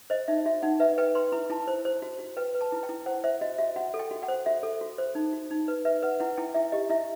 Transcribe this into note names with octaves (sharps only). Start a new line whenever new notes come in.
C5 D#5
D#4 E5
F#4 E5
D#4 F#5
B4 E5
B4 G5
B4 C6
E4 B5
E4 A5
C5
C5
F#4
F#4
B4 G5
B4
A5
E4
G5
E4
C5 F#5
C5 E5
F#4 D#5
F#4 E5
F#4 F#5
A4
G5
F#4
F#5
C5
F#4 E5
A4
F#4
C5
D#4
F#4
D#4
B4
B4 E5
B4 F#5
E4 F#5
E4 G5
E4 E5
G4 D#5
E4 E5